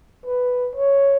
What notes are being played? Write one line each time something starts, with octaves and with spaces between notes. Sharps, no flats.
B4
C#5